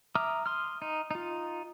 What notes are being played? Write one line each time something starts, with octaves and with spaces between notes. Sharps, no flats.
E5 A#5 D6 D#6 F6
C6 D#6 F6
D#4
D#4 F4